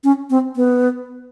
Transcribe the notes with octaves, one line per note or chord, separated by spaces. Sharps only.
C#4
C4
B3